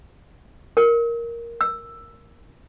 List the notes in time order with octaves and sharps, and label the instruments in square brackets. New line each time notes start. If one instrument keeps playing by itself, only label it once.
[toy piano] A#4
E6